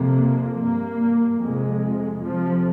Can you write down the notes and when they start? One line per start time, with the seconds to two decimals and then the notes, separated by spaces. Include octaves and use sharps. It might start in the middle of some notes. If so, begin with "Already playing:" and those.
Already playing: F2 C3 A#3
0.57 G2 A#3
1.39 F2 C3 G#3
2.22 F2 C3 F3